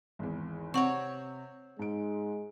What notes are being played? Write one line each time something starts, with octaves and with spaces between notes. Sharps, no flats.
G#1 E2
C3 C4 C#5 F#5 C#6
G#2 G#3 D7